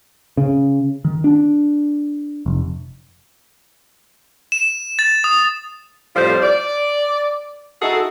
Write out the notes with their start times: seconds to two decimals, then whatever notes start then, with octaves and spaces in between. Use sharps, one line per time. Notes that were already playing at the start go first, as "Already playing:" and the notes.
0.37 C#3
1.05 D#3
1.24 D4
2.46 F1
4.52 E7
4.99 A6
5.24 D#6
6.16 F2 A2 F3 G3 F4 C5
6.43 D5
7.82 D#4 E4 F#4 G#4 A4